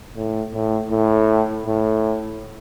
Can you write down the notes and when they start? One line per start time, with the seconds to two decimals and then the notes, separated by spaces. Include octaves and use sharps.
0.17 A2
0.54 A2
0.91 A2
1.66 A2